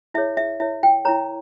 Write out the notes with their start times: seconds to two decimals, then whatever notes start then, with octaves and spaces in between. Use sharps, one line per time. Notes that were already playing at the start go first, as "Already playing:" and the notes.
0.14 E4 G#4 C#5 E5
0.37 E5
0.60 E4 A#4 C#5 E5
0.83 G5
1.05 E4 A#4 C#5 A#5